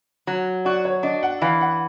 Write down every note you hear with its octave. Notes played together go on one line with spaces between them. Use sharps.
F#3
F#4 D5
C#5
D4 D#5
F#5
E3 F5
F#5